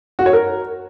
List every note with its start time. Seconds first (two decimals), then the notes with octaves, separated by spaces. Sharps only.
0.19 F#4
0.26 C#5
0.33 A#4